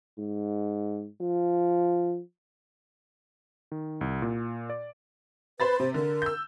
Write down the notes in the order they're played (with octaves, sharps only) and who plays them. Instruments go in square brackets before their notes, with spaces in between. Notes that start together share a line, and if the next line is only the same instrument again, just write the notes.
[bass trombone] G#2
F3
[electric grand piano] D#3
C2
A#2
D5
[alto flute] B4 [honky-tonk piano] C5 B5 A6
[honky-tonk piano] C3 [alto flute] C5
[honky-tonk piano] D3 [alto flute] A#4
[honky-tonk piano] E6 G6